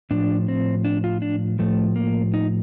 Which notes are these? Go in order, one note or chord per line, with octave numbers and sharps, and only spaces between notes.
A2 F3 D4
C4
D4
F4
D4
A2 F3 A3
A#3
D#4